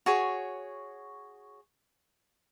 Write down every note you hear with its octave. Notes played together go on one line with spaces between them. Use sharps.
F#4 G#4 C#5